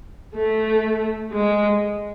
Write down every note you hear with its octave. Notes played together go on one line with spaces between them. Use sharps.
A3
G#3